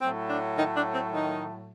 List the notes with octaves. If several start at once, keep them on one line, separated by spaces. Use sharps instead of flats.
A2 F#3 A3 C4
D4
D#3 D#4
D4
C4
D#3 D#4